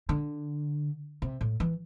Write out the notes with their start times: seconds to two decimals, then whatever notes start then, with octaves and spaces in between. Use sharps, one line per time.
0.09 D3
1.22 C3
1.41 A2
1.60 E3